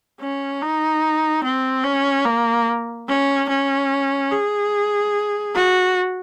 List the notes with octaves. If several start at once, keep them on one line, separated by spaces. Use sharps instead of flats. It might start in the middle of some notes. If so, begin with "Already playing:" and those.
C#4
D#4
C4
C#4
A#3
C#4
C#4
G#4
F#4